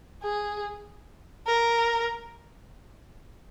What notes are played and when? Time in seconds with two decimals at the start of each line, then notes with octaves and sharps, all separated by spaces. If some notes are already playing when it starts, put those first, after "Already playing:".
0.23 G#4
1.47 A#4